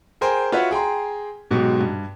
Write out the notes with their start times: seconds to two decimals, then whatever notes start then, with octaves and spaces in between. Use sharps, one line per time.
0.21 G#4 A#4 C5 G5 G#5
0.52 F4 F#4 B4 C#5 E5 F#5
0.71 G#4 G5 A#5 C6
1.51 G#2 B2 F#3 G#3 G4
1.81 G2